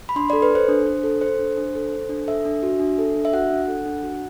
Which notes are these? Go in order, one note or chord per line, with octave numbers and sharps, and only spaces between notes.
B5
D4 C6
A4 D5
B4
A4 C5
D4
D4
A4
A4 C5
D4
D4
A4
A4
D4
A4 E5
D4
F#4
D4
A4
D4
E5
F#4 F#5
D4
A4
D4
F#4